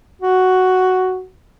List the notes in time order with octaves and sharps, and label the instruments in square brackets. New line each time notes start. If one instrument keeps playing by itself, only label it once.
[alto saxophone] F#4